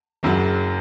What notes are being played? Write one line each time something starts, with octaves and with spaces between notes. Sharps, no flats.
F#1 F#2 C#3 F#3